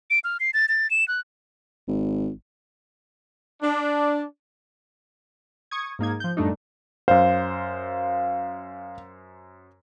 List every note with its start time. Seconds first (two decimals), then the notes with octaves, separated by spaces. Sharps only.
0.10 D7
0.24 F6
0.40 C7
0.54 A6
0.69 A6
0.91 E7
1.08 F#6
1.88 G#1
3.62 D4
5.71 C#6 D#6 G#6
5.99 G#2 A#3 D#4 G#6
6.20 F3 G6
6.37 F#2 A2 G3 A3 D4 D#4
7.08 F#2 C5 F5